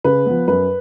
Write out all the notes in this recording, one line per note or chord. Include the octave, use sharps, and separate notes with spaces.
C#3 B4
F3 B3
F#2 B4